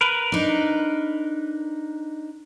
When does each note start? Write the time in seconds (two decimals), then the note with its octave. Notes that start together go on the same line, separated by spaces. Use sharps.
0.01 A#4 B4
0.32 D4 D#4